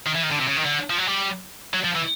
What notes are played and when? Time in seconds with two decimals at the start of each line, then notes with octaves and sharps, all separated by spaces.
0.07 D#3
0.16 E3
0.24 D#3
0.32 D3
0.40 C3
0.49 C#3
0.57 D#3
0.65 D3
0.90 F3
0.98 F#3
1.07 G3
1.74 F#3
1.84 F3
1.95 E3